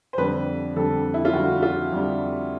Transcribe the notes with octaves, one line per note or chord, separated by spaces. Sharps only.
C5
F2 D3 G3 B4
F2 D3 G3 A4
E4
F4
F2 D3 G3 F#4
F4
F2 D3 G3